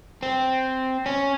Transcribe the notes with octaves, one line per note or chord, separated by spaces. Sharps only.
C4
C#4